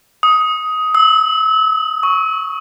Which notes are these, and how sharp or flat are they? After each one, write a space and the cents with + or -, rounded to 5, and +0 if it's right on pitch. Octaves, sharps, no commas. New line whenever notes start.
D#6 +15
E6 -35
C#6 +0